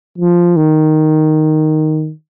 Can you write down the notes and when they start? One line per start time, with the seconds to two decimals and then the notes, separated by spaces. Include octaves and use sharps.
0.18 F3
0.56 D#3